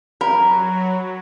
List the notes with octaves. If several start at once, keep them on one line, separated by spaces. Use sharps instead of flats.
F#3 A#4 B5